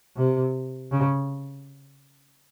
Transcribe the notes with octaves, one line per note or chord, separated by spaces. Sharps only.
C3
C#3